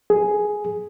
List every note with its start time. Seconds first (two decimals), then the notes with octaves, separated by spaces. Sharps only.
0.10 G#4